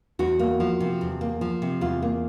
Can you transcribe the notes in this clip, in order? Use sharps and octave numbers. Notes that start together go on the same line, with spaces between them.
E2 F#4
A#3
F3
C3
E2
A#3
F3
C3
E2 F4
A#3